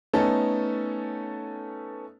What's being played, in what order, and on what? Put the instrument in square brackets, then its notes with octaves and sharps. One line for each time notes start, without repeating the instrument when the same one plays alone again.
[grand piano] A3 B3 C#4 D#4 A4